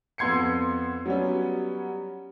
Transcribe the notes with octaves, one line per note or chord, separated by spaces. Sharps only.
F2 B3 C6 G#6 C7 C#7
F#3 G3 B3 C#4